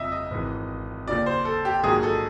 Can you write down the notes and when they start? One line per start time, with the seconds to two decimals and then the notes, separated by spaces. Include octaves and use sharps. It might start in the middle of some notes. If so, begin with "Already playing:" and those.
Already playing: G1 F2 C#3 D#5 E5
0.12 D#5
0.31 G#1 G#2 E3
1.07 D#2 C#3 F3 D5
1.26 C5
1.45 A4
1.65 G4
1.84 A#1 G#2 D#3 F#3 G#4
2.03 A4